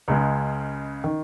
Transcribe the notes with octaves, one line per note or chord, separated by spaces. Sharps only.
C#2 C#3 G#3
D#3